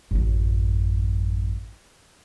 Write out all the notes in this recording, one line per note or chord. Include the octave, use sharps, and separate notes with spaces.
A1 F#2